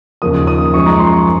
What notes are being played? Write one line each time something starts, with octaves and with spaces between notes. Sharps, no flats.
D#2 C#3 F3 A#3 D#6
D#6
F#2 F3 G#3 C#6
A#5
C6
C#6